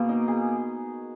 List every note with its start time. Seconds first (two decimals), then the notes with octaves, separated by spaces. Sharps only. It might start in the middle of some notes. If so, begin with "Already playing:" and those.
Already playing: B2 A#3 G#4
0.09 D#4
0.28 G#4